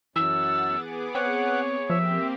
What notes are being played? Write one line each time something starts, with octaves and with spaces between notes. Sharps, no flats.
F#2 E3 F#5 E6 A6
B3 G#4 D6
C4 C#5 F#5
F3 A#3 C4 G4 E5